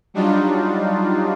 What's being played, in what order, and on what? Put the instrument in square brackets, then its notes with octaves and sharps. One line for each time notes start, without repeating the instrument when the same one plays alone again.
[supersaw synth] F#3 G3 D4 D#4 F4